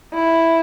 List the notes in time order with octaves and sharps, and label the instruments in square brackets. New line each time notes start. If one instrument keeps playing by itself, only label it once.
[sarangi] E4